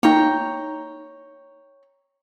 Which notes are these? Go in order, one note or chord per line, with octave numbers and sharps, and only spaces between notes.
A#3 D#4 C#5 G5 A#5